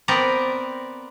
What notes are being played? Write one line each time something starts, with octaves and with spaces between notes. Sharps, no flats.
B3 C4 A#4 D5